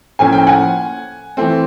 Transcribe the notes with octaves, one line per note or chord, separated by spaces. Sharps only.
A2 F3 A#3 C#4 G#5
G5
F#5 G#5
E3 A3 C4